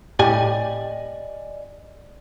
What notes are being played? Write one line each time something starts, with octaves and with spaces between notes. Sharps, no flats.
A2 G4 D5 D#5 G#5